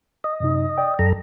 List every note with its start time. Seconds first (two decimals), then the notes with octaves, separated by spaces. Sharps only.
0.24 D#5
0.40 F#2 C3 D#4
0.78 D5 G5
0.99 F#2 A4 A#5